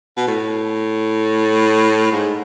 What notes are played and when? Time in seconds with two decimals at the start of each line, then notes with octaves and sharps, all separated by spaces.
0.17 B2
0.27 A2
2.12 G#2